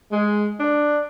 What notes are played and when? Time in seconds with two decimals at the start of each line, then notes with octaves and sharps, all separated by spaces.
0.12 G#3
0.59 D4